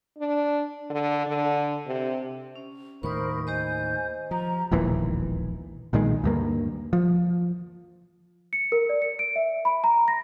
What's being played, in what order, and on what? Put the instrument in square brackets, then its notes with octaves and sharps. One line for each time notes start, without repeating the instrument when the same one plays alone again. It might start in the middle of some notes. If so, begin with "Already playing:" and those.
[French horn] D4
D3
D3
C3
[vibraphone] C#4
[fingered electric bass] D#2 A2 D#3 [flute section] A#4 C5 B5 [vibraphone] C#6 D#6
[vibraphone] G4 C5 D#5 [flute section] G#5 G6
[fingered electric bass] F3 [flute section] A#5
[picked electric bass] E1 A#1 D#2 E3
B1 A#2 D#3 G#3
D2 G2 A#3
F3
[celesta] C#7
A#4
D5
C#7
D7
E5
B5
A#5
A#6